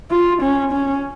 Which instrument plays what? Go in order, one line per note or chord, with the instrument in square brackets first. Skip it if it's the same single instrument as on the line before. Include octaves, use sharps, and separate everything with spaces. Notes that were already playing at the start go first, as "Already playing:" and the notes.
[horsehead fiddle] F4
C#4
C#4